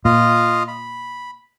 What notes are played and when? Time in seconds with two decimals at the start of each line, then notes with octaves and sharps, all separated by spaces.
0.05 A#2 F4 D#5 F5
0.68 B5